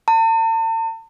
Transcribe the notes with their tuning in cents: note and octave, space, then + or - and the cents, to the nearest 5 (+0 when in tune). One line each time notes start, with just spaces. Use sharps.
A5 +45